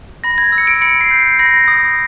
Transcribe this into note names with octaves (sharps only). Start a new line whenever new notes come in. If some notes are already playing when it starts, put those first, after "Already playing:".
B5 A#6
G#6
E6
C#7
D7
B5 C#7
C7
G6
C7
B5 A#6
D#6